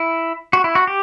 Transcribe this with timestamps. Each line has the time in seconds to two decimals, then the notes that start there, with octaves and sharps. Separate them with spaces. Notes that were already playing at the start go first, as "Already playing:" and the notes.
Already playing: E4
0.53 F#4
0.64 E4
0.75 F#4
0.87 G4